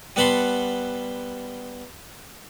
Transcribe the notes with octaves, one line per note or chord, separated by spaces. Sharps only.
G3 B3 F#5 A5 B5 C6